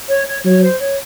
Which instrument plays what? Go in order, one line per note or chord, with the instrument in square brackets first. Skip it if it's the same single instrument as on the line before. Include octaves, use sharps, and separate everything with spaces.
[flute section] C#5
C#5
[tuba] F#3 [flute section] C#5
[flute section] C5
C#5